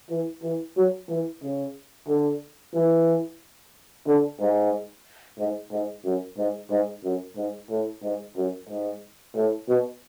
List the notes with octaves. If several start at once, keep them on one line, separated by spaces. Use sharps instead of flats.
E3
E3
F#3
E3
C#3
D3
E3
D3
G#2
G#2
G#2
F#2
G#2
G#2
F#2
G#2
A2
G#2
F#2
G#2
A2
B2